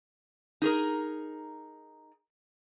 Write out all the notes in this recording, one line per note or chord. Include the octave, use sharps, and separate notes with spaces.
D#4 G#4 A#4